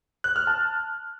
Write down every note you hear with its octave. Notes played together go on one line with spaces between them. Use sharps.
F#6
F6
A5